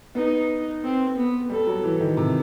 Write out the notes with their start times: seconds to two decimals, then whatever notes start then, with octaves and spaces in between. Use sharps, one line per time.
0.15 B3 D#4
0.83 C4
1.17 B3
1.50 G3 A4
1.67 F#3
1.84 E3
2.01 D#3
2.17 C3